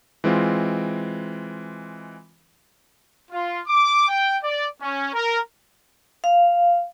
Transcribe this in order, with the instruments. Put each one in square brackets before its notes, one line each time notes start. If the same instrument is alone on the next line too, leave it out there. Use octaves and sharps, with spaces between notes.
[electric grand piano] E3 G#3 C4 F4
[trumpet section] F4
D6
G5
D5
C#4
A#4
[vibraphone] F5